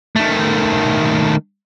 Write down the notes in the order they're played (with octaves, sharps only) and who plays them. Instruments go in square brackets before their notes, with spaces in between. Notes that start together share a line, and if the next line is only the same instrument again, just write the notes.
[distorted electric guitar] D#3 A3